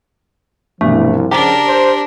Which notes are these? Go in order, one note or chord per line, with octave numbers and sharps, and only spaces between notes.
C2 G2 B2 E3 F3 A3
C#3 F3 D4 G4 A#4 G5 A#5
C5